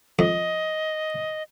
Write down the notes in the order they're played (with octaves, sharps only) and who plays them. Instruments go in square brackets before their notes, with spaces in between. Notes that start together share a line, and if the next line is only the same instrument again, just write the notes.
[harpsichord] F2 [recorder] D#5